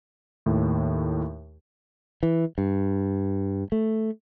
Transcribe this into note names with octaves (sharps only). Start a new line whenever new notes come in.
D#2 A2
E3
G2
A3